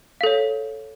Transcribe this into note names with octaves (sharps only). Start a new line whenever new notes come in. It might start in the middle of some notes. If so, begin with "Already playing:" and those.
A4 C#5 F5